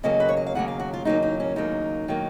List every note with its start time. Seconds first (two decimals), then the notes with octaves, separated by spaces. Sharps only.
0.03 D#2 C#3 F#3 A#3 D#5
0.20 B4
0.29 C#5
0.37 D#5
0.46 F5
0.55 D#2 C#3 F#3 A#3 F#5
0.68 F5
0.79 F#4
0.93 F4
1.05 D#2 C#3 F#3 A#3 D#4
1.23 D#4
1.40 C#4
1.56 D#2 C#3 F#3 A#3 D#4
2.08 D#3 F#3 A#3